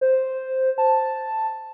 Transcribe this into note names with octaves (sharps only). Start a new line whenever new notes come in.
C5
A5